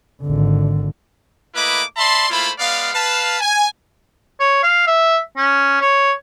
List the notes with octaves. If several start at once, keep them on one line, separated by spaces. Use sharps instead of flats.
G#1 D3
A3 A#3 E4 B4 D#5 D6
D5 E5 A5 B5 C6
A3 A#3 E4 F4 C5 B5
G#3 B3 D5 F5
B4 F5 A5
G#5
C#5
F5
E5
C#4
C#5